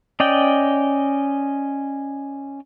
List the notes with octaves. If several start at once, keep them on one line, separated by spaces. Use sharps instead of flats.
C#4 D5 D#5 G5